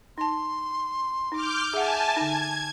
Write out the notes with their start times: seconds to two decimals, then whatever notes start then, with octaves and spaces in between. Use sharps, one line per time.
0.18 D#4 A5 C6
1.32 D#4 D6 F6 G6
1.73 G#4 E5 F#5 G#5 A5
2.16 D3 D#4 G#6